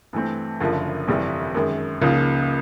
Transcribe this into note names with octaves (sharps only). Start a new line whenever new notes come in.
G2 E3 A3 C4
F#1 F#2 D3 F3
G1 F2 C3 E3 G3
F#2 D#3 G#3
C#2 C#3 F3 A#3 D#4